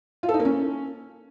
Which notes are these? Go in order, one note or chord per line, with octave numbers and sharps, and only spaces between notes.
F4
A4
D#4
A#3
C#4